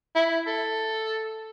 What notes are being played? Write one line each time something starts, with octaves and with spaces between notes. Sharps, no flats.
E4
A4